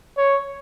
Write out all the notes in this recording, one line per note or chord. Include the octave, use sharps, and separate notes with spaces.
C#5